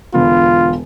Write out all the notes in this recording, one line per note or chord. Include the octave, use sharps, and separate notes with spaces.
E1 D3 B3 F4